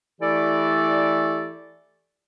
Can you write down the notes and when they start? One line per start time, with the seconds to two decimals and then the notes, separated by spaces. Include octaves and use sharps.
0.21 E3 A3 E4 G4 A4 D5